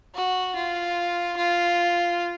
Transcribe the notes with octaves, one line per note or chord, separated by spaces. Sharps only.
F#4
F4
F4